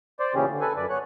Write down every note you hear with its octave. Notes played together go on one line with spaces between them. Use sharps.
C5 D5
A#2 C#3 E3 C#4 G4 G#4
D3
A4 B4 G#5
F#2 B4 D5
B3 C#5 F#6